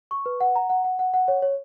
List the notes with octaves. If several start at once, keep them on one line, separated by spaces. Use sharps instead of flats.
C#6
B4
F#5
A#5
F#5
F#5
F#5
F#5
C#5
C#5